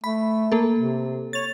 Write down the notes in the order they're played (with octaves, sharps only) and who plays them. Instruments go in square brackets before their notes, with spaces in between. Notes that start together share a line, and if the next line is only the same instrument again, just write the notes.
[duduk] A3 [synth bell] B5
[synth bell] A#3 A4
[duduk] C3
[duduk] C#5 [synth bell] A6 F7